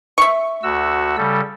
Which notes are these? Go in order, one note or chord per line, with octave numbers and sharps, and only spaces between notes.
E5 C#6
D2 F#4 E6
C#3 G3 A4